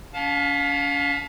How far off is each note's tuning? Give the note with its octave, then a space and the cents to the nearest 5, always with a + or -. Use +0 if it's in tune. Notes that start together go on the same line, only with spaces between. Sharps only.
C#4 +35 F5 +25 A5 -20